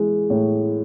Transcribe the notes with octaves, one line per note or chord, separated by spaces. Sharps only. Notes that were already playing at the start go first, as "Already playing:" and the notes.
Already playing: E3 G#3
A2